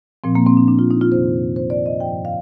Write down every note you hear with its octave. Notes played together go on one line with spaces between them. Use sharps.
A#2 F3 C4
A#3
C4
D4
D4
F4
D#4
F4
F2 C3 D#3 C5
C5
D5
D#5
G2 F3 G5
F5